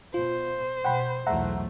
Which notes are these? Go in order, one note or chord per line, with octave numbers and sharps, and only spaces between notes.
B2 F4 C5
B2 F#5 G5 B5
B1 E2 A3 E5 F#5 A#5